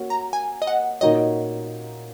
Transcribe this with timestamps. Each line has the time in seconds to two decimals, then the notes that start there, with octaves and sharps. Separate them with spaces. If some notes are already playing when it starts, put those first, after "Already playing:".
Already playing: A#3 F#4 A#4 C#5
0.10 A#5
0.33 G#5
0.62 D#5
0.67 F#5
1.01 A#2 A#3 D#4 F#4 C#5 D#5